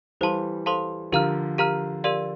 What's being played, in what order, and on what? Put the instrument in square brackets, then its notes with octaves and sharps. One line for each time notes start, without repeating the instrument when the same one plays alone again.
[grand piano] E3 G3 [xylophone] A4 C5 F5 A5 C6
[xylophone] A4 C5 F5 A5 C6
[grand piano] D3 F3 [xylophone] G4 A#4 F5 A#5 F6
[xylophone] G4 A#4 F5 A#5 F6
G4 A#4 D5 F5 C6